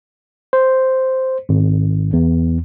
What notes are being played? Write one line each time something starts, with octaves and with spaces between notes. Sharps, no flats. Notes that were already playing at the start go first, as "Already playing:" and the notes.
C5
G#1
E2